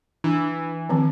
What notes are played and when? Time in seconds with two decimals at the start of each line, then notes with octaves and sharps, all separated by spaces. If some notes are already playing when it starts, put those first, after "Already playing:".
0.24 E3 D4
0.89 D#3 F3 C4